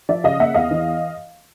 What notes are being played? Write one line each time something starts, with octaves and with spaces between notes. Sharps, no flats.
F3 D5 E5
C#3 D#5 F5
A#3 E5 F#5
E2 D#5 F5
E3